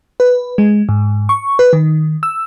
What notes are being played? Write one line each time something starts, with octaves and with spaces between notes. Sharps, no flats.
B4
G#3
G#2
C#6
B4
D#3
E6